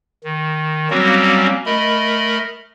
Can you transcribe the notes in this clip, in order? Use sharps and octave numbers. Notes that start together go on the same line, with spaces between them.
D#3
F#3 G3 A#3 C4 C#4 F#4
A3 A#4 D#5 B5